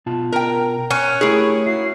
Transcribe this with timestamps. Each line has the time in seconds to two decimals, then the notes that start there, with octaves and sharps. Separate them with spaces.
0.06 B2 F4 A5
0.32 A#4 G5 A#5
0.90 C#4 F#6
1.21 A3 E4 G4 G#4 A#4 C#6
1.66 E4 F#4 C7